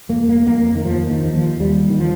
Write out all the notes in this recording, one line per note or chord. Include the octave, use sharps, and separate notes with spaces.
F2 A#3
A#3
F2 A#3
A#3
D#3
D#2 F3
D#3
D#2
F3
D#2 G3
D#3
F3